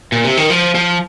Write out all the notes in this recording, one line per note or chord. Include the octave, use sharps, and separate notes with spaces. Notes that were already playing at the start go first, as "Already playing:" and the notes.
A#2
C3
D#3
F3
F3